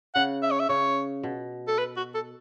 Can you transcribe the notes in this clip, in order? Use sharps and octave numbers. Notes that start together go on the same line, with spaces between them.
C#3 F#5
E5
C#5
E5
C#3 C#5
B2
A4
B4
F#4
A4